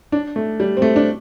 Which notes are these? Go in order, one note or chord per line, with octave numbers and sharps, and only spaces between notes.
D4
A3
G3
C4
A3
D4